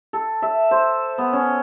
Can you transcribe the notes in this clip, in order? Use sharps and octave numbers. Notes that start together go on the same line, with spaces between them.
A4
E5
C5
B3
C#4